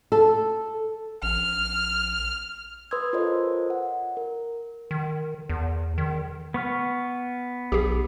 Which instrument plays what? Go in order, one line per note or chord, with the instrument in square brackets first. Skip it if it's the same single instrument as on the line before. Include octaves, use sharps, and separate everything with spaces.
[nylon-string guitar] A4
[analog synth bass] A#1 [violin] F6
[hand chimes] B4 C6 D#6 E6 G#6
F4 A4 A#4 C5 C#5 D#5
F#5
A#4
[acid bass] D#3
E2
D#3
[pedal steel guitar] B3 C#6 F6
[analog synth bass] B1 [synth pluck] G4 G#4